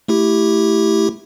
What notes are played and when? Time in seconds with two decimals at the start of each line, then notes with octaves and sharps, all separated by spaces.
0.08 A3 E4 G4